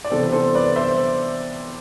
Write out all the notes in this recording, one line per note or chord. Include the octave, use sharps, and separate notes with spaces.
D5
C3 E3 B3 D4 A4 C5
A4 C5
B4 D5
C5 E5